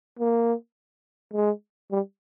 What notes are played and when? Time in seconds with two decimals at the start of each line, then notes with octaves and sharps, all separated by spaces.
0.19 A#3
1.34 G#3
1.91 G3